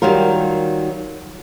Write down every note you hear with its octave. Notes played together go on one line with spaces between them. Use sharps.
D#3 F#3 G3 F4 A#4